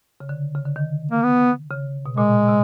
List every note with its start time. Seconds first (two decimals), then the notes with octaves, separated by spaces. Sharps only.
0.20 C#3
0.29 D3
0.55 C#3
0.66 D3
0.76 D#3
1.12 A#3
1.23 B3
1.71 C#3
2.06 B2
2.17 A#2 G#3
2.48 C3